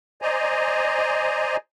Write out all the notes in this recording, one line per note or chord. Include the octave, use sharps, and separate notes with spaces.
C5 D5 D#5 G#5 A#5